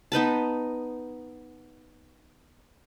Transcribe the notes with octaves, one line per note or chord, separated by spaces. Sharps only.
B3 D#4 B4 A5